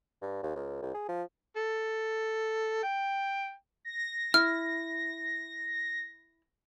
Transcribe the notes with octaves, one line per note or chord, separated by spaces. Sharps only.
G2
D#2
C#2
C2
G#4
F3
A4
G5
A#6
E4 F6